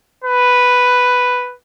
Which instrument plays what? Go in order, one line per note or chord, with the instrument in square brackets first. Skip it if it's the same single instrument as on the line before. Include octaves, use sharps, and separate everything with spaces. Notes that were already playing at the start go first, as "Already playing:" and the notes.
[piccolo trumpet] B4